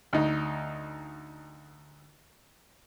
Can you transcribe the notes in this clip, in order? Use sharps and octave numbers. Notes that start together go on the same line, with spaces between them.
D2 D#4